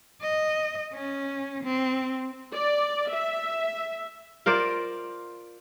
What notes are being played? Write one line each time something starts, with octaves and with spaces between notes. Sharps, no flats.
D#5
C#4
C4
D5
E5
F4 A#4 C5 D5